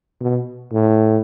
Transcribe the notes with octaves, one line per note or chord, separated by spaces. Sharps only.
B2
A2